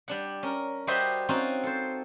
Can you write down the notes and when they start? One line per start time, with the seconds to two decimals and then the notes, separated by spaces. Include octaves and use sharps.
0.08 G3 D4 F#5
0.43 C#4 A#4
0.87 G3 F#4 G4 C5 D#5 E5
1.29 C4 C#4 D#4 F4 F#4
1.63 A4 C5